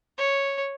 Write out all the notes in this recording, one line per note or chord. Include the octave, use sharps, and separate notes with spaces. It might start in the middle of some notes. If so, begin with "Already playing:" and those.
C#5